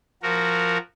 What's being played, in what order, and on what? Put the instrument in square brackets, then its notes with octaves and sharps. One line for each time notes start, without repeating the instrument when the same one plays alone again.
[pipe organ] F3 F#4 A#4